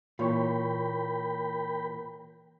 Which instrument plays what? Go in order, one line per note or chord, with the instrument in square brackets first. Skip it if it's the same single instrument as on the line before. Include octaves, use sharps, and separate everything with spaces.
[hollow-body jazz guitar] A#2 E3 [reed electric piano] F4 C#5 C#6 [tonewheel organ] A#4 G5 B5